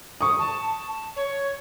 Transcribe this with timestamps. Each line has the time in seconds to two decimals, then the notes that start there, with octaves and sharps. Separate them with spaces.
0.21 C#6 D#6
0.39 A5
1.16 C#5